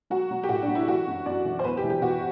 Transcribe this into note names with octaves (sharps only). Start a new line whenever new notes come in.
F#3 F#4
F#3
G4
A2 F#4
D4
F#3
E4
E3 F#4
F#2
F#2 D5
E3
C5
E2 B4
G4
E3
G4
E3 F#4